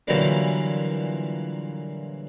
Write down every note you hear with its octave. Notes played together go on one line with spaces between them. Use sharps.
A#2 D3 E3 F#3 G3 A#3